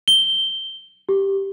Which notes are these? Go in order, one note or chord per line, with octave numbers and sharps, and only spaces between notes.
G7
G4